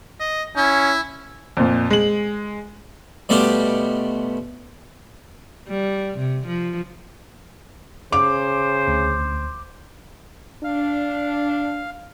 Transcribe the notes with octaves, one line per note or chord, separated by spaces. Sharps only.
D#5
C#4 E4
F2 A#2
G#3 F#7
B2 G3 A3 B3 F4 G4
G3
C3
F3
C#3 C5 D6
D2
D4 F5